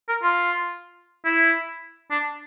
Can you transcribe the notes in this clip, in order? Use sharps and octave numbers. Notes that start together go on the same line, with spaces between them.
A#4
F4
E4
D4